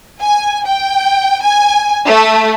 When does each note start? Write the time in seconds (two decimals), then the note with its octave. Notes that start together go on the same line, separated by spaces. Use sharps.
0.22 G#5
0.67 G5
1.42 G#5
2.06 A3